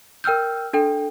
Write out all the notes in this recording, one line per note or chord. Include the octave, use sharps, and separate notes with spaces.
A#4 G5 E6 F6 G6
D4 A4 G5